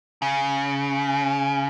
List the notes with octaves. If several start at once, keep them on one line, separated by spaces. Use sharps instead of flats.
C#3